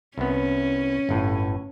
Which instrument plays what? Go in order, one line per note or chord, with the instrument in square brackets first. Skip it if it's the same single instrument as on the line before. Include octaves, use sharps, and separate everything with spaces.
[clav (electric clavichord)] C2 B3 [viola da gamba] C#4
[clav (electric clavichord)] G1 A2